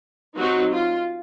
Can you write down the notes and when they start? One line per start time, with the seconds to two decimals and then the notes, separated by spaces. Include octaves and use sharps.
0.37 F#3 C4 D#4 F#4
0.72 F4